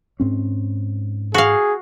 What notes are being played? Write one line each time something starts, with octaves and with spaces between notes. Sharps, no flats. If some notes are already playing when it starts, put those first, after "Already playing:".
G#2 C4 C#4
F#4 G#4 F5